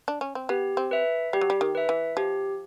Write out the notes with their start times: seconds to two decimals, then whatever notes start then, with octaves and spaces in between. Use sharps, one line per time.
0.08 D4
0.21 C#4
0.35 C4
0.49 B3 G4
0.77 C4
0.91 B4 E5
1.33 G3 G4
1.41 F#3
1.50 G3
1.61 D#3
1.75 B4 E5
1.89 E3
2.17 F3 G4